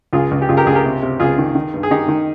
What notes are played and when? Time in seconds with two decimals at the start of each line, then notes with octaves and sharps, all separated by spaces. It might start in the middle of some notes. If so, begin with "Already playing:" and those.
0.13 C#2 F4 G#4
0.31 C#2
0.42 G4
0.49 C#2 F4 G#4
0.57 G4 A#4
0.66 C#2 F4 G#4
0.75 G4 A#4
0.85 C3
1.02 C3
1.20 C#2 F4 G#4
1.38 D#3
1.55 D#3
1.74 G2
1.83 G#4
1.91 D#3 D#4 G4
2.08 D#3